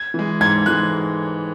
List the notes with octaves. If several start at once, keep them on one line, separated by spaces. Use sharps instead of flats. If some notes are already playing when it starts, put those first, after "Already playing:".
Already playing: G#6
E3 G#3
G#2 G#6
E3 G#3 F#6